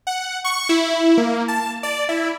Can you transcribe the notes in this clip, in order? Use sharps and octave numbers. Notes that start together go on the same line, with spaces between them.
F#5
C#6
E4
A#3
A5
D5
E4